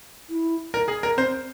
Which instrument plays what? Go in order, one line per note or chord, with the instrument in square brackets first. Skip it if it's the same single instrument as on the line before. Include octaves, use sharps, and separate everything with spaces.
[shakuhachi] E4
[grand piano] A#4
G#4
A#4
[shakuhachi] C4 [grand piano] C5